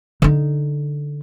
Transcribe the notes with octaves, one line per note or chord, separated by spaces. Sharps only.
D3 D#4